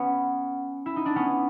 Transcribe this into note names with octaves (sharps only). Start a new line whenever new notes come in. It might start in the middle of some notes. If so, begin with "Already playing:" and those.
Already playing: B3 C#4
E4
D#4
D4
B3 C#4